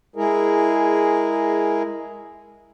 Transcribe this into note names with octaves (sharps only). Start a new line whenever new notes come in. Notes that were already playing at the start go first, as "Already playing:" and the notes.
G#3 E4 G#4 A#4